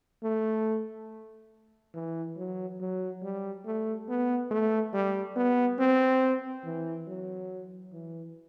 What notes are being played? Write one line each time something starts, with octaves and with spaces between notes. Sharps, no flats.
A3
E3
F#3
F#3
G3
A3
B3
A3
G3
B3
C4
E3
F#3
E3